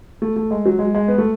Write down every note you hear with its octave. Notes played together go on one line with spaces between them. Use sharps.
A3
A3
G#3
F#3
G#3
G#3
B3
A3